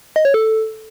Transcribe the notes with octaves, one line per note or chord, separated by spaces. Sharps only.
D#5
C#5
A4